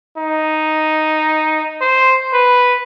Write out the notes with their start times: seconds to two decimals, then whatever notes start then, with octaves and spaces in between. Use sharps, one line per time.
0.18 D#4
1.81 C5
2.33 B4